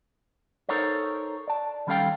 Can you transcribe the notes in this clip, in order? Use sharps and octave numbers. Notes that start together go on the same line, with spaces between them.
D#4 A4 A#4 C5 C#5
D5 A5
D#3 G3 C#4 A4 F5 G5